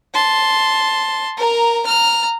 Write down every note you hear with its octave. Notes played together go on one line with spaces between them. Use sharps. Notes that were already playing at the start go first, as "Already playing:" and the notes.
A5 C6
A#4 A#5
A#5 F6